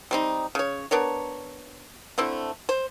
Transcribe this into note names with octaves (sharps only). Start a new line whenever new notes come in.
G3 C4 D#4
C#3 C#5
B3 D4 A#4 C#5
D3 A3 C4 E4
C5